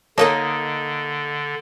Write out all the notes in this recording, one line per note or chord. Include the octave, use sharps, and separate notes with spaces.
D3 A#3 D#4 F#4 A4 C#5 D#5 A5